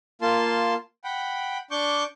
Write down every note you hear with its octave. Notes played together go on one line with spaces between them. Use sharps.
A#3 F4 A5 C6
F#5 G5 B5
D4 C#6 D6 G6